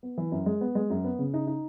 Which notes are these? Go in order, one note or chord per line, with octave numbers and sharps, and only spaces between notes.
B3
E3
F#2
G#3
B3
G#3
F#2
B3
C#3
D#4
D#4